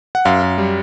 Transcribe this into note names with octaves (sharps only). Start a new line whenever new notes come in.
F#5
F#2 F5
F#2
G3